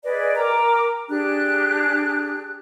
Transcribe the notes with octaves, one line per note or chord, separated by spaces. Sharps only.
G#4 B4 D5 D#5
A#4 G5 A#5 D6
D4 G4 G#4 F#6